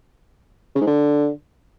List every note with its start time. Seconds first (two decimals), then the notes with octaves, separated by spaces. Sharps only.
0.75 C#3
0.81 G#2
0.87 D3